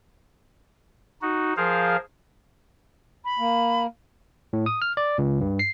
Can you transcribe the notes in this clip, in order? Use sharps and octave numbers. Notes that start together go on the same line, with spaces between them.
D#4 F#4
F3 G#4 A#4 C5 F5
B5
A#3
A2
D#6
F6
D5
C#2
G2
C7